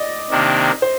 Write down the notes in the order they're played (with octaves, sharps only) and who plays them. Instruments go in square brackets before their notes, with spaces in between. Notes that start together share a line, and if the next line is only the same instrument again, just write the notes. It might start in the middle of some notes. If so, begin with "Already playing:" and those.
Already playing: [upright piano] D5 D#5
[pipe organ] C3 D#3 A#3 D4
[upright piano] C5